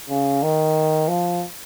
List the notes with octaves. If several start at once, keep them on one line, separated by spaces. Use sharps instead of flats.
C#3
D#3
F3